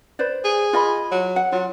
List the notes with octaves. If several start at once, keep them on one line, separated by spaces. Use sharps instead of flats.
B4 C5 D5
G#4
F4 D#5 B5
F#3
F#5
F#3 F4